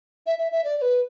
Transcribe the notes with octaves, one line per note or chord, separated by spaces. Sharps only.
E5
E5
E5
D5
D5
B4